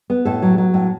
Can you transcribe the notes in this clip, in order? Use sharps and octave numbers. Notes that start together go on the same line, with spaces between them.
B3
A2 A4
F#3
F#3
A2